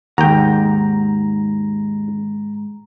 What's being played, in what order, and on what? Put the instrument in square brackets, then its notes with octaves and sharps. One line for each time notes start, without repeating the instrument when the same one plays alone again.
[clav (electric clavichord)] D#2 G5 [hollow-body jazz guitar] G#2 F#5 [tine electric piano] A#5